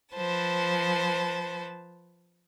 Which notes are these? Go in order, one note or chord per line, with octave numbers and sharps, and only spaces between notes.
F3 B4 C5 A5